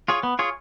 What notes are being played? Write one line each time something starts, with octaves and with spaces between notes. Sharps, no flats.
F4 G#4 C#5
B3
F4 G#4 C#5